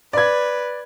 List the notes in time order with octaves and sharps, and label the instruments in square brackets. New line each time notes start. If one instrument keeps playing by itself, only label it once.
[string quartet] B4 [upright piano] D5 G#6